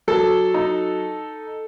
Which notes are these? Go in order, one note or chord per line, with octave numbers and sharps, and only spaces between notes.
F#3 A4 A5
D#4